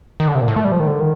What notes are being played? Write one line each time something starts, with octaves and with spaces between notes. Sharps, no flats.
D#3
D3
C3
A#2
A2
A3
G3
F3
D#3
D3
D#3